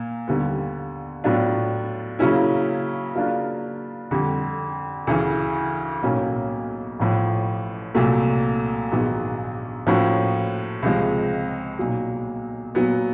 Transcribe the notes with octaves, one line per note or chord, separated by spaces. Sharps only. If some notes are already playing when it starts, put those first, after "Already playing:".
Already playing: A#2 A#3
D#2 D3 G3 B3
A2 F#3 B3 D4 F4
C#3 F#3 A#3 C#4 E4
C#3 F#3 A#3 D4 F4
F2 D3 G3
D2 C#3 E3
B1 A2 F#3 A#3 C#4
A1 A2 F3
C2 A#2 F#3 A3
A#1 G#2 D#3 F#3 B3
A2 F3 A#3 C#4 F#4
C#2 C3 F3 G#3
B1 A#2 F#3
A#2 F#3 B3